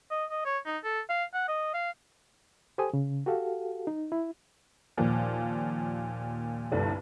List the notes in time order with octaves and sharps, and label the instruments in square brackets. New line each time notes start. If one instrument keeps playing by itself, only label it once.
[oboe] D#5
D#5
C#5
D#4
A4
F5
F#5
D#5
F5
[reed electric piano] G4 A4 C5 G#5 D#6
C#3
F#4 G4 A4 F5
D#4
E4
[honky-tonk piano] D#2 A#2 F3
G1 C2 G2 A3 D4